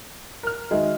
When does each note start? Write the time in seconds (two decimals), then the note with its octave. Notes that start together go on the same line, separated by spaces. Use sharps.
0.43 A#4 F6
0.71 D#3 G#3 F#4 D#5 E5